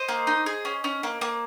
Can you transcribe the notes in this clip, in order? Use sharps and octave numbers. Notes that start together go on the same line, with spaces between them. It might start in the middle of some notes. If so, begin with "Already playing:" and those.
Already playing: C5 D#5
A#3
D#4
G#4
C#4
C#4
A#3
A#3